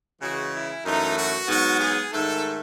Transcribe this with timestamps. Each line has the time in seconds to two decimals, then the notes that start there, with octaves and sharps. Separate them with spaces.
0.20 C#3 E3 G#3 F#4
0.53 E4
0.84 F#2 E3 A3 D#4
1.16 F#4
1.48 G#2 F#3 B3 F#4
1.80 G#4
2.12 G#2 D#3 A3 A4